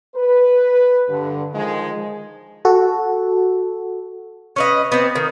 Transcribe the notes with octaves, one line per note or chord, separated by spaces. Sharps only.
B4
G2 D3
D#3 F3 G#3
F#4 A4
C#4 B4 D#5
B3 C4
D#3